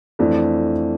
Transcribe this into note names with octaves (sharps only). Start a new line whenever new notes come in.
F2 E3 A3 D4